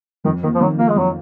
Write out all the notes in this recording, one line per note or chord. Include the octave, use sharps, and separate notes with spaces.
F2 D#3
D#3 A#3
F3
D#3 F#3
A#3 F4
G#3
F2 F#3